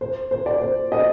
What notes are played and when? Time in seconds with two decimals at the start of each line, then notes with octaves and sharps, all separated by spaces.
0.01 C5
0.31 C5
0.46 D5
0.61 C5
0.92 D#5